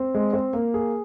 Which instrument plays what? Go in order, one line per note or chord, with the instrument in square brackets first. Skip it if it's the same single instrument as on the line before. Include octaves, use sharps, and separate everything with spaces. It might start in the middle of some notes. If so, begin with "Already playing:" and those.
Already playing: [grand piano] C4
G#3
C4
A#3
G#4